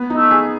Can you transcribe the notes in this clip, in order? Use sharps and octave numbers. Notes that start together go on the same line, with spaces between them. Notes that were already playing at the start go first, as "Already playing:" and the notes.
Already playing: B3
D#4
A3
G#4